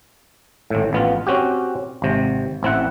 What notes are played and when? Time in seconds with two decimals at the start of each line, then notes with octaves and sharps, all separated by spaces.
0.70 G#1 A2
0.93 A1 B3 F4
1.27 C4 C#4 F#4 G4
2.02 G#1 C3
2.63 A1 C4 E4 F#5